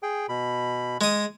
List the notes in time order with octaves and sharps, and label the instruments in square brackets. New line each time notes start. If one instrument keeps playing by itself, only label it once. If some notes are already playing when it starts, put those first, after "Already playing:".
[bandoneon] G#4 G5
B2 B5
[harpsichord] G#3 D#6